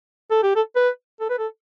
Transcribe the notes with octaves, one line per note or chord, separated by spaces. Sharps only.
A4
G4
A4
B4
A4
B4
A4